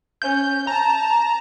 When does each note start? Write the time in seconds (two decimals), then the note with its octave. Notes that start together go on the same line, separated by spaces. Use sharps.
0.22 C#4 G6
0.67 A5 A#5